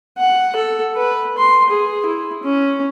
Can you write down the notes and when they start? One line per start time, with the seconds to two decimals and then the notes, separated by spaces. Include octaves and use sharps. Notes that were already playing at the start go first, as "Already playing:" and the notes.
0.18 F#5
0.56 A4
0.96 B4
1.38 C6
1.70 G#4
2.06 E4
2.43 C#4